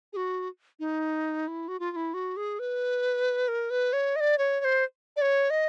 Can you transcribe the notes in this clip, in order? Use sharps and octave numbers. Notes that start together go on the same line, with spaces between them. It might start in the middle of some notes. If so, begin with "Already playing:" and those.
G#4
F#4
D#4
E4
F#4
F4
F4
E4
F#4
G#4
B4
A#4
B4
C#5
D#5
D5
C#5
C#5
C5
D5
C#5
D#5